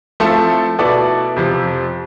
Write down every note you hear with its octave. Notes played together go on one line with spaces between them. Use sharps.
F3 A3 C4 E4 A4
B2 B3 E4 A4 D5
F2 C3 F3 C4